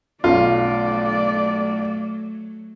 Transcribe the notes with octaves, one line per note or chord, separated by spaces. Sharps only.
B1 F#3 A3 C#4 F4 D5